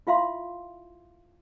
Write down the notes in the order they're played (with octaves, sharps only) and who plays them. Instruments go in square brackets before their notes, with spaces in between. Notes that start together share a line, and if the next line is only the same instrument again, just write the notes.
[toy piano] E4 F4 E5 F5 C6